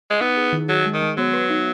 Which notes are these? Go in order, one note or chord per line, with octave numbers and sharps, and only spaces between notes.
G#3
B3 D#4
G#4
D#3
F#3 G#4
G#3
D#3
G#3
F#3 B3
B4
D#4